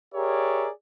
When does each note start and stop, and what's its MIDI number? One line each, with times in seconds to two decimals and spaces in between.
0.15 0.70 67
0.15 0.70 68
0.15 0.70 70
0.15 0.70 73
0.15 0.70 74
0.15 0.70 76